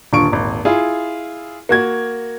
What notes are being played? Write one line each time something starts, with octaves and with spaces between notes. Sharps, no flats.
D#1 D3 F4 C#6 D7
D#1 G#1
E4 F4 G#4
A#3 F#4 G#6